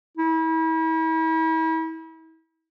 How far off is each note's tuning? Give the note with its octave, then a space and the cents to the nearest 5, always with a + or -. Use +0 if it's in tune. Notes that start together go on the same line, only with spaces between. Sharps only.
E4 -40